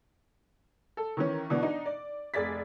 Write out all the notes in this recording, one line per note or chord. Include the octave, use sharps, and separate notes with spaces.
A4
D#3 E3 C#4
B2 E3 B3 D4
D4 D#4
D5
F1 G#4 D5 A6 B6